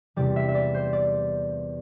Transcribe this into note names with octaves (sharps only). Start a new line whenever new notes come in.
E2 C3 G3 D5
E5
E5
D5
C5
D5